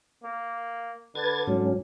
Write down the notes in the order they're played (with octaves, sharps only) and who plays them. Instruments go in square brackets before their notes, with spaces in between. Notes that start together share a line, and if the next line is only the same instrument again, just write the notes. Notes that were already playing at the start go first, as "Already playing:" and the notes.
[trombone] A#3
[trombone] D3 [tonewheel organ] B4 G#6 A6
[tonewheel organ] G#2 F#3 C#4